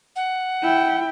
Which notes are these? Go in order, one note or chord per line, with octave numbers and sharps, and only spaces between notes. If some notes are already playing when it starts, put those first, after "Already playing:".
F#5
E4 G5